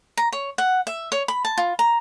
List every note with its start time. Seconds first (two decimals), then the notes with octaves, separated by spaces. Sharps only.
0.17 A#5
0.33 C#5
0.58 F#5
0.87 E5
1.12 C#5
1.28 B5
1.45 A5
1.57 F4
1.79 A#5